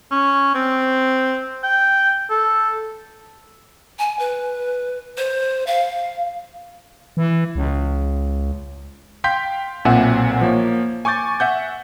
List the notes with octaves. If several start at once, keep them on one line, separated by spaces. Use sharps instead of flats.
C#4
C4
G5
A4
G#5
B4
C5
F5
E3
C#2
F5 G5 C6 G6 B6
B1 A#2 C4 E5 F#5 G#5
F3 A#3 C#5
G#5 C#6 D6 G6 A6
E5 F#5 G6